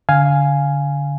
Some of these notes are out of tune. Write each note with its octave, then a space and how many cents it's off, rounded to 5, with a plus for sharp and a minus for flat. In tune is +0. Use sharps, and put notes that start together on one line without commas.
D3 -25 F5 +0 G#5 +0